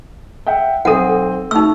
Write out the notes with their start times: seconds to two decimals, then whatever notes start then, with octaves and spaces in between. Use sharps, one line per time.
0.47 E5 F#5 G5
0.85 B1 C4 A4 F#5 D#7
1.51 A3 D#4 F#4 E6